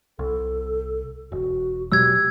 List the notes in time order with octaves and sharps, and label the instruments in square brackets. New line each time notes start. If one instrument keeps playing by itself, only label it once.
[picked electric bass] C2 [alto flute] A4
[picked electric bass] E1 [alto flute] F#4
[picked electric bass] B2 F#3 G#3 [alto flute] G4 [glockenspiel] E6 G#6